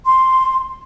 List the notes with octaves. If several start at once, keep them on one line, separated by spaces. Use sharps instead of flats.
C6